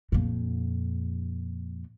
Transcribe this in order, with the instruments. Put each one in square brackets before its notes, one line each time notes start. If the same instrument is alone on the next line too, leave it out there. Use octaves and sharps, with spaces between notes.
[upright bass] F2 A#2